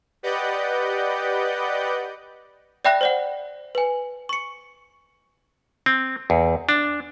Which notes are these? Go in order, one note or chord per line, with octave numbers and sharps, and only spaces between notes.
G4 B4 D5 D#5 F#5 G6
D5 E5 G5 B5 F#6 A#6
C5 D5 F#5
B4 G#5
C#6 C#7
C4
E2
D4